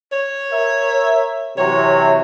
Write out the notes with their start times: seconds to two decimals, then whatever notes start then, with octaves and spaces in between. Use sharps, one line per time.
0.13 C#5
0.51 A#4 E5
1.57 C3 E3 F#3 C#5